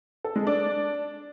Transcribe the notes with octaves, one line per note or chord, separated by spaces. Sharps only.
A4
G#3
D4